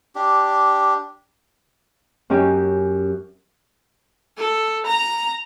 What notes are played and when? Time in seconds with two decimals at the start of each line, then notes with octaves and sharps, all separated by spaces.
0.15 D4 G4
2.30 F#2 C#4 G4
4.38 A4
4.86 A#5